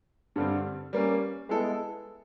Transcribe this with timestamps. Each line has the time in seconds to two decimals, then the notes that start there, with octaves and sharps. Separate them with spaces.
0.36 G2 D3 G3 C4
0.93 G3 A#3 C#4
1.49 G#3 B3 E4 A4